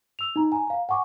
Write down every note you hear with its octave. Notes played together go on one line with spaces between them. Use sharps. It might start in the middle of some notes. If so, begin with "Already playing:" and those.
E6 F7
D#4 A#5
G#5 A#5
F5 A#5
F#5 G#5 C#6 D6